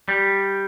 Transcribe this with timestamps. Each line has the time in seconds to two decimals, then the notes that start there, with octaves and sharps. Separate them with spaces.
0.09 G3